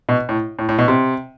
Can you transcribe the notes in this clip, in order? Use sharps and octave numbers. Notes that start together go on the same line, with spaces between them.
B2
A2
A2
A2
B2
C3